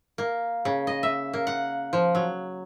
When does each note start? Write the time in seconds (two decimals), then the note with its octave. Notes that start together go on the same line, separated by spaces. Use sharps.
0.18 A#3
0.65 C#3
0.87 D#5
1.03 E5
1.34 A#3
1.47 F#5
1.93 F3
2.15 F#3